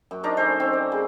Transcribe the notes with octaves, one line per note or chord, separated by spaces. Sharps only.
F#2
D4 D#4 A#4 D5
C#4 A4 C5
C4 C#4
D5
C#3